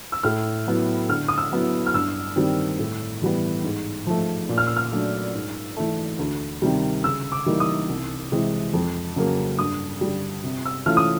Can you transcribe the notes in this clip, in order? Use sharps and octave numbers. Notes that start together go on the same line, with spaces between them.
E6
A2 F6
F#3 B3 E4
D3 F6
D#6
E6
F#3 B3 E4
F6
G2 E6
D#3 G3 C4
A2
E3 G3 B3
G#2
F3 A3
A#2
F6
E6
F6
F#3 A3 D4
G#2
E3 A3
D2
C3 D#3 G3
C#3 E6
D6
E3 G3 A#3 D#4
D#6
C2
C3 E3 G#3 C4
F2
C#3 F#3 A#3
G2 D#6
D3 G3
C3
E6
E3 A3 C#4 F4 F6
D#6